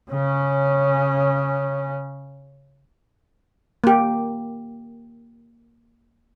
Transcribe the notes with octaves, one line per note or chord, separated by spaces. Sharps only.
C#3 C#4
A#3 G4